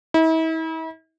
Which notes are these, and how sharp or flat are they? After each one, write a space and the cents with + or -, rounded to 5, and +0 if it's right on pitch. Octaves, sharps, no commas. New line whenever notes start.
E4 -40